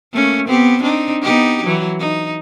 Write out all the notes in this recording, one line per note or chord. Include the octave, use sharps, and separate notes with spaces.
A3 A#3 C#4
B3 C4 G4
C4 D4 D#4
B3 D#4 G4
E3 F#3
D#4